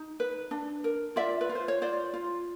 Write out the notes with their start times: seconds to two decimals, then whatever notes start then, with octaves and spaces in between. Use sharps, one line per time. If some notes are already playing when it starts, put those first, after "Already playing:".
Already playing: D#4
0.20 B4
0.51 D4
0.84 A#4
1.16 F4 D5 E5
1.41 B4
1.49 F4
1.55 C5
1.68 C#5
1.82 F4 C5 D5
2.13 F4